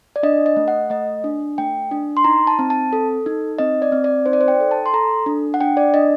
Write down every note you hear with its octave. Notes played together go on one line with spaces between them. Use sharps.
D5
D4 D#5
D#5
A3
F#5
A3 D#5
D4
A3 G5
D4
C6
D#4 A#5
A5
C4
A5
A4
D#4
C4 D#5
D5
C4
D5
D#4 C5
D5
C5
G5
A4
A5
C6
A4 A#5
D4
F#5
D4 G5
D5
D4 D#5